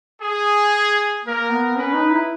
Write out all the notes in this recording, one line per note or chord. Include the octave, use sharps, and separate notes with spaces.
G#4
A#3 A#4
B3
C#4 B4
D#4
E4